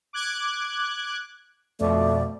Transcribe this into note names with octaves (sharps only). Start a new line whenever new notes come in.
D6 F#6 G#6
F2 B2 A3 D5